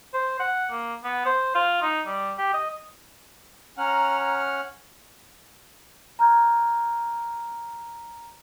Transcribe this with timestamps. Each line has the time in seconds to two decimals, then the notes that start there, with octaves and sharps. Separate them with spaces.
0.14 C5
0.39 F#5
0.70 A#3
1.04 B3
1.26 C5
1.55 F4
1.82 D#4
2.06 G3
2.38 G4
2.54 D#5
3.78 C#4 F#5 A#5 F6
6.19 A#5 F6 G6 G#6